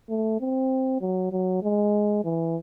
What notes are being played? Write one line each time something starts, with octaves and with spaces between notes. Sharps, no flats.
A3
C4
F#3
F#3
G#3
E3